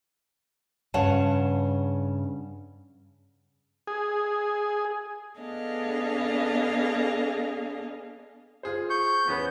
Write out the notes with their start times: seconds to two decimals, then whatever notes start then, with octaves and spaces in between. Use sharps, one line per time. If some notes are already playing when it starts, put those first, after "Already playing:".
0.94 G2 C#3 C#5 F#5 A5
3.87 G#4
5.40 B3 D4 G#4 A4 D#5 F5
8.63 F4 G#4 C5
8.90 C#6 G6
9.28 E2 B3 C#4 B4